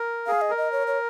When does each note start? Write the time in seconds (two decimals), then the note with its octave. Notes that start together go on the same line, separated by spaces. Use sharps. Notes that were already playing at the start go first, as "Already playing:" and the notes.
Already playing: A#4
0.27 G#4 F5
0.41 D#5
0.50 A#4
0.58 D#5
0.72 C#5
0.87 C#5